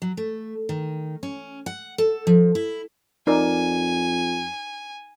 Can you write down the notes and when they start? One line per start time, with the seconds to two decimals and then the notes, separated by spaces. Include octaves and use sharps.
0.02 F#3
0.17 A3
0.69 D#3
1.23 C#4
1.66 F#5
1.98 A4
2.27 F3
2.55 E4
3.27 F2 D#4 A#4 D5 G#5